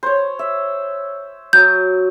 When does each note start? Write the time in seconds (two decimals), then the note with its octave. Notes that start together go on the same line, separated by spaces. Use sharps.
0.03 C5 C#5
0.39 E5
1.53 F#3 D#6 G6